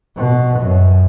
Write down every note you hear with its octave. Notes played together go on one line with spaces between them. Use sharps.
B2
F#2